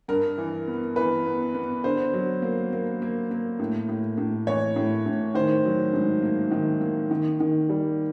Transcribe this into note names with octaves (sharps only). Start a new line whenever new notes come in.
G2 A#4
E3
B3
E3 B4
B3
B3
D3 C5
F#3
A#3
A#3
A#3
A#3
A2
A2
A2
E3 C#5
A2
A2
D#3 C5
F#3
G#2
A#3
D#3
A#3
D#3
D#3
G3